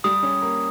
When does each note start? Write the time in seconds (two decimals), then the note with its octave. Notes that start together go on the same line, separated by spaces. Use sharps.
0.04 G3 D#6
0.23 C#4
0.42 A#3